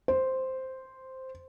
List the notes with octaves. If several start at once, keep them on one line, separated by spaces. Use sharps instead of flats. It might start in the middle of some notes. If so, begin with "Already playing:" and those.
C5